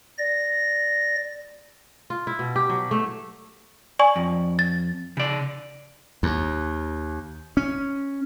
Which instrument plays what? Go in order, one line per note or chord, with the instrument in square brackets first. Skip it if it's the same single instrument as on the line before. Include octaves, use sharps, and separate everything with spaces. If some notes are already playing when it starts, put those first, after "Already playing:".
[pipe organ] D5 A#6
[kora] F4
E4
B2
G4
F#3
A3
[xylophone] D5 G#5 C#6
[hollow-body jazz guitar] F2
[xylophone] A6
[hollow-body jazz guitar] C#3 D5
[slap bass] D#2
C#4